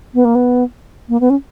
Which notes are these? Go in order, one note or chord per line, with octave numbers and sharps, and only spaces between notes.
B3
A#3
B3
A#3
B3
C#4